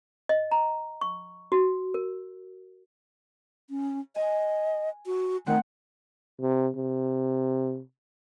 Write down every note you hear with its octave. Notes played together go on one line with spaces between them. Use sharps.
D#5
A#5
C#6
F#4
A#4
C#4
D#5 G#5
F#4
D#3 A3 C4 F#5
C3
C3